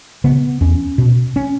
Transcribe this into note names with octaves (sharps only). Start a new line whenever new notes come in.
C#3 B3
E2 C#4
B2
C#4